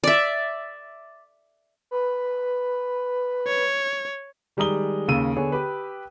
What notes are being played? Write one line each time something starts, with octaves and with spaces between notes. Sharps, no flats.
D5 E5
B4
C#5
D#3 G3 G#3 A#5 D#6 G7
D#2 C#3 E6 D#7
D3 B3 G#4 C#5
G4 B4